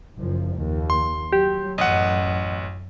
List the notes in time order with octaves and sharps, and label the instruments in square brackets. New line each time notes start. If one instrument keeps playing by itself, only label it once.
[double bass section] F#1 F#2 F3
D#2
[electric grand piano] C6
[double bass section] F#3 [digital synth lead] G4
[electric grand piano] A1 F#5 [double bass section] F#2 [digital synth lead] D#5